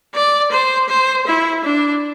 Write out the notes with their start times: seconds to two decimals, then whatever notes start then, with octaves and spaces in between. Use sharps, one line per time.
0.15 D5
0.51 C5
0.89 C5
1.27 E4
1.64 D4